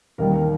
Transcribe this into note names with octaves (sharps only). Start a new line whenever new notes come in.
D#2 D#3 G3 A#4